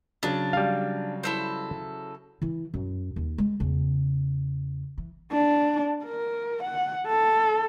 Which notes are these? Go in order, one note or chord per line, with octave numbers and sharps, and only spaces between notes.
C#3 F#3 D4
G3 F5
E4 A4 C5
E3 E4
F#2
D#2
G#3
E2 C#3
E3
D4
A#4
F#5
A4